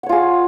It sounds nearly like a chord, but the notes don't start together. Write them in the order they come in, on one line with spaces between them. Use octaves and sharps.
F#5 C#5 F4 G#4